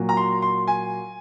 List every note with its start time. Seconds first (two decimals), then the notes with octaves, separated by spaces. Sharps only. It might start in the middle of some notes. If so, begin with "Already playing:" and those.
Already playing: A#2 F#3 A#3
0.09 A#5
0.17 C6
0.42 C6
0.68 G#5